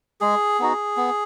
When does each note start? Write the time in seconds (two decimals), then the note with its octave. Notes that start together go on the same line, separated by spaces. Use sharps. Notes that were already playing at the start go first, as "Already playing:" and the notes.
0.21 G#3 G#4
0.60 B3 D#4 F#4
0.97 B3